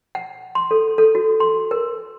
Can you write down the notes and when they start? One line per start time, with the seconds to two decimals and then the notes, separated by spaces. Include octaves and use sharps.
0.15 F#5
0.55 C6
0.71 A4
0.98 A4
1.15 F#4
1.40 C6
1.71 A#4